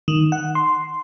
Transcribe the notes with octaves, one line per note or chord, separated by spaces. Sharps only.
D#3
F#5
C6